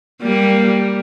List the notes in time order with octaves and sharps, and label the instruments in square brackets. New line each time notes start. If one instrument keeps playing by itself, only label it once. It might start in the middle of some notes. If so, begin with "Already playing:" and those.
[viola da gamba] G3 A#3